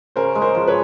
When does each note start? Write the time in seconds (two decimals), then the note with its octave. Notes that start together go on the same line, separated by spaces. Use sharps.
0.16 C#3 A#4 C5
0.35 G#3
0.42 A#4 C5
0.55 F3
0.68 B4 C#5